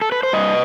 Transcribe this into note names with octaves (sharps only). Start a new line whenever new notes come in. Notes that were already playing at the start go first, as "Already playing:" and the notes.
A4
B4
C5
G2 B4 D#5